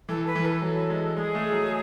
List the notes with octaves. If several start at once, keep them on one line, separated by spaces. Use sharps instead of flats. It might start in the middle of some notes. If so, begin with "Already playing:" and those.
E3 A4
B4
E3
A4
F#3
G#3
G#3 G#4
A3
F#3